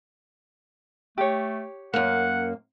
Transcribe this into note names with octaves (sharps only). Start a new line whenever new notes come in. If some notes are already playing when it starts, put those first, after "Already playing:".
A3 G4 C#5
F#2 A#3 F#5